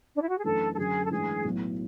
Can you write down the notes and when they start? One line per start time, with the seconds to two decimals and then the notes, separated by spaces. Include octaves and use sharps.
0.14 D4
0.22 E4
0.28 F#4
0.37 G#4
0.44 F#2 E3 A3 D4 A4
0.73 A4
0.78 F#2 D3 F#3 G#4
1.05 A4
1.11 G#2 E3 A3 D4 G#4
1.45 B1 A2 F#3 B3 E4